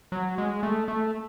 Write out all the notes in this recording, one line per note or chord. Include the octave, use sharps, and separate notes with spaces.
F#3
G#3
A3
A3